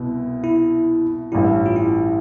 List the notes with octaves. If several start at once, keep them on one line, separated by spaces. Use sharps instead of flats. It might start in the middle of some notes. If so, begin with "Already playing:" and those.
Already playing: C2 B2 B3 E4
E4
A1 G2 E3 G3 E4
F4
E4